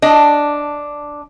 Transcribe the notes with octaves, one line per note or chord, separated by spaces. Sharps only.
D4 D#5